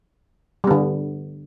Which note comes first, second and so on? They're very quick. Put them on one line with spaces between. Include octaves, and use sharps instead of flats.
G3 B3 D3